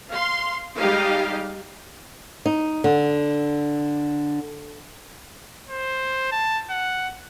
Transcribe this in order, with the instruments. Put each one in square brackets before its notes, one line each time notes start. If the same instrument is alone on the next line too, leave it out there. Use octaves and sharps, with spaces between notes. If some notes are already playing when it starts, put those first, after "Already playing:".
[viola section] F5 C6
G3 G#3 D#4 G4 F5
[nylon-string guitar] D#4
D3
[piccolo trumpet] C5
A5
F#5